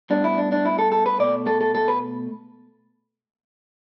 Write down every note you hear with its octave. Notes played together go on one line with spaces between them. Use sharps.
A2 G3 B3 D4
E4
D4
D4
E4
A4
A4
B4
B2 A3 D5
A4
A4
A4
B4